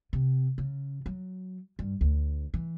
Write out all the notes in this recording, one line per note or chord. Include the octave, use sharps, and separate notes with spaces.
C3
C#3
F#3
G2
D2
E3